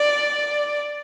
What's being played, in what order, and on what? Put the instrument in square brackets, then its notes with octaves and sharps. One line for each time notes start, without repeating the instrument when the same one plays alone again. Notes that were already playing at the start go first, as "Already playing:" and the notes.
Already playing: [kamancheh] D5